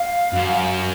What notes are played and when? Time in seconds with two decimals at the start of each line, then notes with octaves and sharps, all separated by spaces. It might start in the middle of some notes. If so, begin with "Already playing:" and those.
Already playing: F5
0.33 F#2